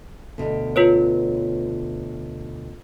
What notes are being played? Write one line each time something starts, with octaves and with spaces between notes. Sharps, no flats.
D2 B2
F4 B4 C#5